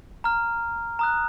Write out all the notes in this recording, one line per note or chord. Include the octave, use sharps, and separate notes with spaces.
A#5 F6
A#5 D#6 F#6